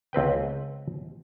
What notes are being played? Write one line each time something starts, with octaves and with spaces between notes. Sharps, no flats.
C#2 C4 B4 G5